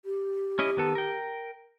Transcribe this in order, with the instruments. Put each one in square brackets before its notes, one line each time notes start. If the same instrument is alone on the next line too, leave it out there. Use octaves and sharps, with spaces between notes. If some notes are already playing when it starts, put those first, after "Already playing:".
[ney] G4
[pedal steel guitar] C#4 E4 D#5
D#3 B3 A4
A#4 G5